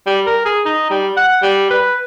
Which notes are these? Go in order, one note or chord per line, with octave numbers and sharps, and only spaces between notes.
G3
A#4
G#4
D#4
G3
F#5
G3
B4